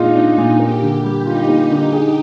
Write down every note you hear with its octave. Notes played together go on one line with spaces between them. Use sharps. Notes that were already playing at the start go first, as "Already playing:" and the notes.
Already playing: A#2 G#3 D4 D#4 F4
D4
A#2
A#3 G4
D3
G4
G3
D#4 F4
A#3
D3
G#4